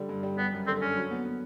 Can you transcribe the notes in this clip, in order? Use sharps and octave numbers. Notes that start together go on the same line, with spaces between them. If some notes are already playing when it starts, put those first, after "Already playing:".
Already playing: D3 G3
G2
G3
G3 B3
F#2
D3 C4
D3 C#4
F#3
B3
B3